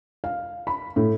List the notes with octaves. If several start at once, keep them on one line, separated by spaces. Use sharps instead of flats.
F5
B5
A2